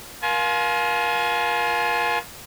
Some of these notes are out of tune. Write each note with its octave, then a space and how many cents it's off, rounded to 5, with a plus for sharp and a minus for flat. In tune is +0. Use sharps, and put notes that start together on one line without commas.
F4 +15 A#4 +35 G#5 +35